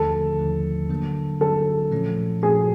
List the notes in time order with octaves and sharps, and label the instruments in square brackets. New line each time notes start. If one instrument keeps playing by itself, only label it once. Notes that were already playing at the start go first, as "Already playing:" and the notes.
Already playing: [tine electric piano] D#2 D3 F3 A3 [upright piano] A4
[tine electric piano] D#2 D3 F3 A3
D3 F#3 A#3
[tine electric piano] D3 F#3 A#3 [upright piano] A4
[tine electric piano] A#2 F3 A3 C#4
[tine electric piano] A#2 F3 A3 C#4 [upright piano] G#4